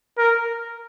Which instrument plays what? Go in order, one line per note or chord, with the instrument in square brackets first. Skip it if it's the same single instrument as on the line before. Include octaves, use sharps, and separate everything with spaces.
[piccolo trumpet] A#4